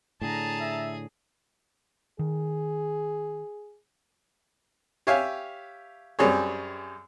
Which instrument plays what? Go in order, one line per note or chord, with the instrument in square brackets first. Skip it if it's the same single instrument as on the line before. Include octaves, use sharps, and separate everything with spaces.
[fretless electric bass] A2 D3 [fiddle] G#4 [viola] A5 A#5
[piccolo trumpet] E5
[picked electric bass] D#3 [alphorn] G#4
[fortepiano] G4 C#5 E5 F5 G#5
F#2 G3 C4 G#4 C#5